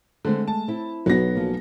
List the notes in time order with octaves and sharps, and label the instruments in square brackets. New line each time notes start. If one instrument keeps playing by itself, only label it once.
[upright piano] D3 C4 [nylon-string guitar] G#3 A3
[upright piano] A5
[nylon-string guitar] C4 E4
[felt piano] B1 B3 [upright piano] F#3 A#6
[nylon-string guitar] F3 A#3